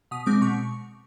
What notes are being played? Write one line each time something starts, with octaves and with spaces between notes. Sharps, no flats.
B2 D#6
G#3 C4 D6
B2 C#6